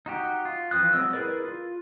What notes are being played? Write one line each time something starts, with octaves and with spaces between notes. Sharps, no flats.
D#4 F#4 G4
F4
E3 F3 C4 D#6 F#6
F#3 G#3 C4 D#5 E6
E4 G#4 A#4 B4 D5
F4